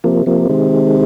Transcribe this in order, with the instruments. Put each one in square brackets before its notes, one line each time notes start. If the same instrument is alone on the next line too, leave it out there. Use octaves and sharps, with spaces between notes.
[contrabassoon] C3 [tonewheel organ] F3 A#3
[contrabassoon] C3 [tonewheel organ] F3 A#3
[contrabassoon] C3 [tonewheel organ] D#3 G#3